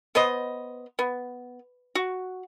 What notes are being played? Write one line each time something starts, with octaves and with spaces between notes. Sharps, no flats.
B3 B4 C5 D#5
B3
F#4